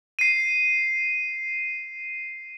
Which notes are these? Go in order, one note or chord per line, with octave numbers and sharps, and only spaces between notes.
C7 D#7